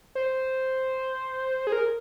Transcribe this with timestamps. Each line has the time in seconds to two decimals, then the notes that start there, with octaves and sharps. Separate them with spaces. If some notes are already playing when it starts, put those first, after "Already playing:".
0.15 C5
1.67 G#4
1.72 A#4